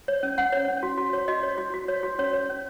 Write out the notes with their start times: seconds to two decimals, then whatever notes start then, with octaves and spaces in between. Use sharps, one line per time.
0.08 C#5
0.23 C#4
0.38 C#4 F#5
0.52 C#5
0.68 C#4
0.83 F#4
0.97 F#4
1.13 C#5
1.28 F#4 D#5
1.43 C#5
1.58 F#4
1.74 F#4
1.88 C#5
2.03 F#4
2.19 C#4 C#5
2.33 C#5
2.49 C#4